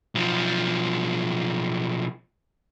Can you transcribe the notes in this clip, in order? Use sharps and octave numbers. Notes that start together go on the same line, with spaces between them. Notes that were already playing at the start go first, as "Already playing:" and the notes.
B1 F3